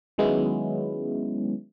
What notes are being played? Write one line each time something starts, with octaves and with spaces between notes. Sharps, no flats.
D#3 F#3 G#3 B3 C#4 E4